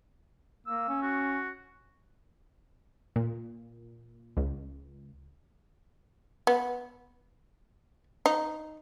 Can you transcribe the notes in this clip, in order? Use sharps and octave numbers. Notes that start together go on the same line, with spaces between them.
A#3 E6
C#4
F#4
A#2
C#2
B3
D#4